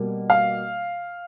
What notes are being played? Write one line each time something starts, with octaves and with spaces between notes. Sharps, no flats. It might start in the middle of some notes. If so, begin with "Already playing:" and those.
Already playing: B2 G3 A#3
F5